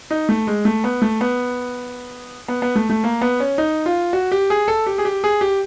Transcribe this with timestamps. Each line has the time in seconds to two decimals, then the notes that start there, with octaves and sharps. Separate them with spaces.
0.11 D#4
0.29 A3
0.47 G#3
0.65 A3
0.84 B3
1.02 A3
1.21 B3
2.48 B3
2.62 B3
2.76 A3
2.90 A3
3.04 A#3
3.21 B3
3.40 C#4
3.58 D#4
3.86 F4
4.13 F#4
4.32 G4
4.50 G#4
4.68 A4
4.87 G4
4.98 G#4
5.05 G4
5.24 G#4
5.41 G4